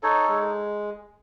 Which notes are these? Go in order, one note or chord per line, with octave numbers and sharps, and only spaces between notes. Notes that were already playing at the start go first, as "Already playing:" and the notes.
D#4 A4 C#5
G#3